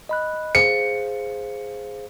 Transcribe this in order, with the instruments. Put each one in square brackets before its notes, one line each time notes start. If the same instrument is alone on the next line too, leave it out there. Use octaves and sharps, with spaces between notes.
[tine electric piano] D#5 B5 F#6
[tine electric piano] G#4 C5 F5 [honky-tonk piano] C#7